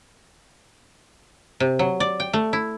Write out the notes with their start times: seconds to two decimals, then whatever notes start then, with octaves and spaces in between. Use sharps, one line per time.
1.60 C3
1.79 F#3
2.00 D5
2.20 G5
2.34 A3
2.53 E4